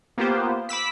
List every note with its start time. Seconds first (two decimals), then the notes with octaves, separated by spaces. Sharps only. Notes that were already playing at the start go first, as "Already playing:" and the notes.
0.18 A#3 B3 F4 G4 C5
0.69 B5 D6 E6 B6